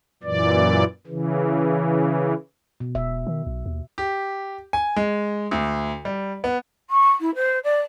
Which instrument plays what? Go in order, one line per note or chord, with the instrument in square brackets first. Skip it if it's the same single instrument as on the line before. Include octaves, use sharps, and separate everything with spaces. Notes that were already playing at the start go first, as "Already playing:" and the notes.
[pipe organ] F#2 A#2 E3 D5
C#3 E3
[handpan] B2
[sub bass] E1 [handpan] E5
[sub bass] D#3
B1
D#2
[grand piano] G4
G#5
G#3
D2
G3
B3
[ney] C#6
E4
C5
D5